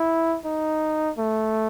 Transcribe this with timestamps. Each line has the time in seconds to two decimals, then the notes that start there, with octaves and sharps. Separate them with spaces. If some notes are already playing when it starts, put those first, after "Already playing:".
Already playing: E4
0.45 D#4
1.18 A3